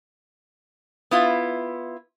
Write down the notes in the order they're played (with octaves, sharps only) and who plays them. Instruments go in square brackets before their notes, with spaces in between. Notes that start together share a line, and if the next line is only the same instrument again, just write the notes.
[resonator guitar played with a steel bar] B3 E4 F4